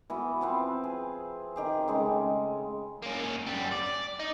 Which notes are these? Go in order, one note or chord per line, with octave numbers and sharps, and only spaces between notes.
E3 B3 F#4 B4
F3 C4 B4
G#4
D#3 G4 G#4
C#3 G#3 A3
A#3 C#4
F#2 G3
D5
D#4